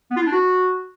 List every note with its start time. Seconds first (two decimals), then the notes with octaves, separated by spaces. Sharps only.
0.11 B3
0.16 F4
0.21 E4
0.27 D4
0.32 F#4